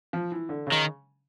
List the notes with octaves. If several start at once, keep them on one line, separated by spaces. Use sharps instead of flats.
F3
E3
D3
C#3
D#3